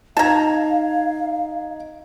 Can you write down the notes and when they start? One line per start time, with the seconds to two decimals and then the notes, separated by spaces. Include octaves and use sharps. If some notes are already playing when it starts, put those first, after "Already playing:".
0.17 D#4 F5 A5 A#5 G#6